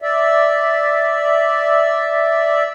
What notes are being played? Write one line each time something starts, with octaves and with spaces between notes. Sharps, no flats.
D5 E5